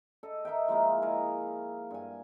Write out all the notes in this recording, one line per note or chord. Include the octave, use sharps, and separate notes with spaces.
A4 D#5
D#4 A#4 E5 G5
F3 G#3 A#3 E4
G#4 A#4 D#5 F5
G2 G#5